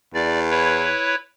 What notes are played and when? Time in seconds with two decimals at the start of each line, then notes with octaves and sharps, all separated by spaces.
0.14 E2 D5
0.50 E4 B4 C#5